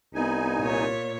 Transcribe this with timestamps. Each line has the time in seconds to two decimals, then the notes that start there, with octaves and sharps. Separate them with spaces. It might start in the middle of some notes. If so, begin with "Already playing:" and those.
0.15 C2 B3 D#4 G#5
0.60 A#2 C#5